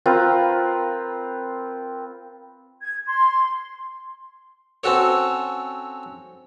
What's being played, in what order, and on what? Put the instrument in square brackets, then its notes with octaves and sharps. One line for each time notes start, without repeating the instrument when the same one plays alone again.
[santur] C4 F4 A#4 B4
[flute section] G#6
C6
[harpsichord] C4 C#4 F#4 A4 C#5